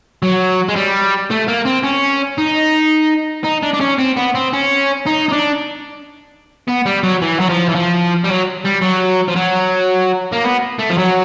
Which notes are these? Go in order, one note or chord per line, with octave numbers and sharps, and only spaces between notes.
F#3
G#3
G3
A3
A#3
C4
C#4
D#4
D#4
D4
D4
C#4
C4
B3
C4
C#4
D#4
D#4
D4
B3
G3
F#3
E3
F#3
F3
E3
F3
G3
F#3
G3
F#3
F3
F#3
A#3
B3
A3
F3
F#3